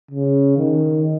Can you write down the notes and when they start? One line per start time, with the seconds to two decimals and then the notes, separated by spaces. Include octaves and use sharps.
0.11 C#3
0.57 D#3